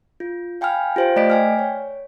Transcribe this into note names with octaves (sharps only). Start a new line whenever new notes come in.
F4
F5 G5 G#5 B5 F6
F4 G4 C5 F5 G5
A3 D5 D#5 B6 D7
G5 G#5 F6
C#5